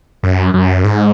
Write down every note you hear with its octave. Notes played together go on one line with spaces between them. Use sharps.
F#2
F#2
G#2